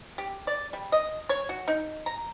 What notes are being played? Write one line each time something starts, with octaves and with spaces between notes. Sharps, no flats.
G4
D5
G3
D#5
C#5
F#4
D#4
A#5